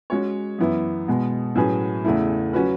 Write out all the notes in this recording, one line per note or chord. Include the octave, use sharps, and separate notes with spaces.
G#3 C#4 F#4 C#5
F#2 E3 B3 E4
B2 G#3 B3
A2 F#3 C#4 G#4 B4
E2 C#3 E3 A3 E4
F#3 C#4 F#4 B4